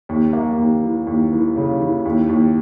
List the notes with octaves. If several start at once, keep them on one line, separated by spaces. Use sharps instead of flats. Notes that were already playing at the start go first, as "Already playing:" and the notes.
D#2
A#3
D#2
E3
D#2
E3
C#3
E3
D#2
D#2